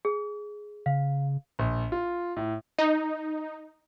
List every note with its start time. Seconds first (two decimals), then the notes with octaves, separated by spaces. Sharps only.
0.05 G#4
0.86 C#3 F5
1.59 A#1
1.92 F4
2.36 A2
2.78 D#4